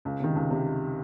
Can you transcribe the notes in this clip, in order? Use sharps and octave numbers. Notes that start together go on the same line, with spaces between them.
C#2
C3 D#3
C#2
C3